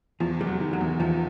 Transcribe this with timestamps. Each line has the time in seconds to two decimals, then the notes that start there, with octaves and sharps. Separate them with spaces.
0.20 E2 F3
0.40 F1 G3
0.47 F#3
0.60 D#3
0.73 F#3
0.81 E2
1.00 E2 F3